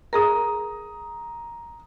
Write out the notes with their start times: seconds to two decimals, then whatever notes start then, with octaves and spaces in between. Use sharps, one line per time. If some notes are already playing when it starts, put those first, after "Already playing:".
0.13 G#4 A#4 A#5 D#6